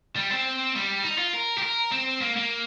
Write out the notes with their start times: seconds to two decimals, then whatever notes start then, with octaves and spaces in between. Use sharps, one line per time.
0.16 G3
0.31 C4
0.75 G3
1.04 D#4
1.18 F4
1.34 A#4
1.58 G4
1.63 A#4
1.92 C4
2.21 A#3
2.37 A#3